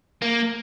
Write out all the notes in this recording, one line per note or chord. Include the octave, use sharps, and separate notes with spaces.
A#3